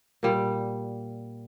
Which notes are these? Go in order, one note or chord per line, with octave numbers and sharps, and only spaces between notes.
A#2 G3